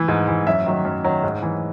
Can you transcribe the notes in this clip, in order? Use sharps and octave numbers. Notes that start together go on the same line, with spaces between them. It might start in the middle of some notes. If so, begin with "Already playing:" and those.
Already playing: E3
G#2
E3
F#2 E5
D#3 F#3
F#2
D#3 F#3
G#2
E3